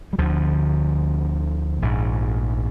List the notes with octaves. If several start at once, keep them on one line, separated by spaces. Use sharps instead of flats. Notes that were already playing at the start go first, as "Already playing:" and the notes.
G3
D2 D3 F3
A#1 G#2